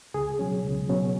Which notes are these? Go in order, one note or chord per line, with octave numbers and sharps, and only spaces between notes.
C#2 G#4
B2 F#3 C#4
C#2
B2 F#3 C#4